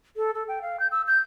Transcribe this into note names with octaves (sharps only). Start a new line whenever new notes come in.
A4
A4
G5
F5
G6
E6
G6